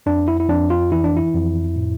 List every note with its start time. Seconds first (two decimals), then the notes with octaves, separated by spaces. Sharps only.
0.06 F2 D4
0.28 E4
0.40 E4
0.49 F2 D4
0.70 F4
0.92 E3 E4
1.04 D4
1.17 E4
1.34 F2
1.76 A2